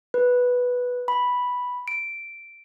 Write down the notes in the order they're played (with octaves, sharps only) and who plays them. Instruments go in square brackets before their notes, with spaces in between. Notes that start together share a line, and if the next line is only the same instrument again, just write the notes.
[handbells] B4
B5
D7